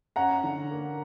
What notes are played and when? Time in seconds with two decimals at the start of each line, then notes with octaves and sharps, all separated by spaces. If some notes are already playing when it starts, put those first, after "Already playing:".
0.16 C#4 F#5 A#5
0.44 D3
0.71 A#3